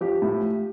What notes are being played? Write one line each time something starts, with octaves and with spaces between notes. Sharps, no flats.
F3 G4
A2